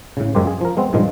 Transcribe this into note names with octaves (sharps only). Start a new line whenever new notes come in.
A2 C#3
F#2 G#3 A#3 G4 C5
G#4
F3 A#4
G#3 B3 C4
G2 A#2 D#3 F3 G#3